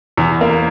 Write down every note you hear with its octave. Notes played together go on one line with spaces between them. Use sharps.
E2
A#3